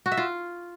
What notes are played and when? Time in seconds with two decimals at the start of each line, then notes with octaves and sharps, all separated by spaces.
0.06 F#4
0.12 E5
0.17 F4